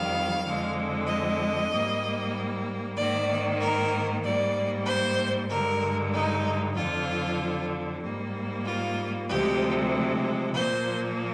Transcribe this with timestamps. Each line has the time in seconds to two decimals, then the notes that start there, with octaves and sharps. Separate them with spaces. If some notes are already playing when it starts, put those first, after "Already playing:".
Already playing: F2 D#3 G3 F5
0.44 F2 D3 G#3
1.07 D#5
1.70 G#2 G3 A#3
2.97 G#2 D#3 A#3 D5
3.60 A#4
4.23 G#2 G3 A#3 D5
4.85 C5
5.49 G2 D3 G#3 A#4
6.13 D#4
6.75 F2 D3 F3 F4
8.02 G#2 G3 A#3
8.65 F4
9.28 D2 C3 F3 G#3 G4
10.53 A#2 F3 A#3 C5